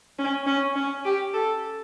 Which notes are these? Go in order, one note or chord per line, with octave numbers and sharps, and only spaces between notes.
C#4
C#4
C#4
G4
A4